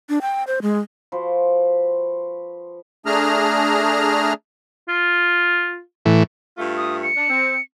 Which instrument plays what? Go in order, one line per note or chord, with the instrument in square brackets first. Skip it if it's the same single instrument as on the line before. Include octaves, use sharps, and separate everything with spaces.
[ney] D4
G5
C5
G#3
[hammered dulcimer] F3 F#4 B4 C5
[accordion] A3 D4 G#4 A#5 F6
[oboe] F4
[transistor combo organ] A2 E3
[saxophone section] G2 A3 F4
[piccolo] D#6
C#7
[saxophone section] D4
C4